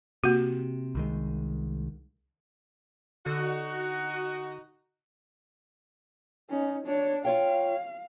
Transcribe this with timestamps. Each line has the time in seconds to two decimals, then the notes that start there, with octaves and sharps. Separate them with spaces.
0.24 C3 A#3 F#4
0.95 C2 D#3 G#3
3.26 D3 D#4 F#4
6.50 C#4 D#4
6.86 D4 C#5
7.25 F4 C#5 F5 G5